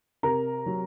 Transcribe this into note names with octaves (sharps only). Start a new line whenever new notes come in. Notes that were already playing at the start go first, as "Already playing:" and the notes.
C3 A#4 A#5
F#3